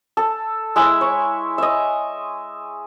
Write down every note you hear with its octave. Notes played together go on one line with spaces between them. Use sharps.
A4
G#3 E4 E5
C#5
D#5 E5